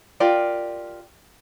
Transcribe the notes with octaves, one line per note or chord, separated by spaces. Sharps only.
F4 G4 A#4 D5